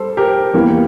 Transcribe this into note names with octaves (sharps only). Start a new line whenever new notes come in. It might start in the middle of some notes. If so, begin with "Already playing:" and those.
Already playing: G3 A4 C5
G4 A#4
E2 E3 G3 A#3